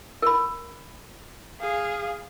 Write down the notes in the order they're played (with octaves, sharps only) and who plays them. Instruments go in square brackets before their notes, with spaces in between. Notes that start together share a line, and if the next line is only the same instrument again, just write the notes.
[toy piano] A#4 B5
[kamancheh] G#4 F5